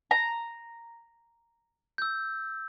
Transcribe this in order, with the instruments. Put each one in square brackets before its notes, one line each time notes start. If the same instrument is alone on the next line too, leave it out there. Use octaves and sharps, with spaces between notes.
[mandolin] A#5
[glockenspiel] E6 G6